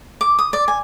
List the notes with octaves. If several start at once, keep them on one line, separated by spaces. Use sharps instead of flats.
D6
D#6
D5
G#5